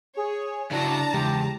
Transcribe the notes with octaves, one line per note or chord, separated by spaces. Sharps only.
G#4 C#5
C#3 D4 E4 F#4 A5 A#5
E2 C#3 G#3 G4